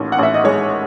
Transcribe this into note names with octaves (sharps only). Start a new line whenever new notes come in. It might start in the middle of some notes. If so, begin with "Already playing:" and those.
Already playing: A1 D#2 D#3
F#5
A1 E5
D#5
G#3 C#5